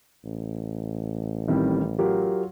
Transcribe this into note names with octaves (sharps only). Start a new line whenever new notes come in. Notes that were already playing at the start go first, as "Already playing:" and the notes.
A1
A2 D#3 G3 C4 E4
F#3 F4 G4 A#4